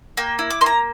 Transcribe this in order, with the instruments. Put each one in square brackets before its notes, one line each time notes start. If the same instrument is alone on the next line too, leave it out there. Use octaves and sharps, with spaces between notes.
[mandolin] A#3 G5
E4
D6
A#3 C6
A#5